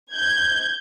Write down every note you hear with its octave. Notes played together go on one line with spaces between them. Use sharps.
G6 G#6